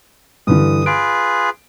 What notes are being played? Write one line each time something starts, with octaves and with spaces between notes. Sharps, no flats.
G2 D3 E3 D#6
F4 G#4 B4 D7